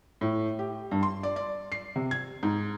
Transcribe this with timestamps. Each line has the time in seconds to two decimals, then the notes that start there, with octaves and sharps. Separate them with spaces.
0.21 A2
0.59 G4
0.92 G2
1.03 C6
1.23 D5
1.36 D5
1.72 C7
1.96 C3
2.11 G#6
2.43 G#2